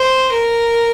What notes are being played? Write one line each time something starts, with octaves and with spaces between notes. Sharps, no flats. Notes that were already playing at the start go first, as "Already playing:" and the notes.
Already playing: C5
A#4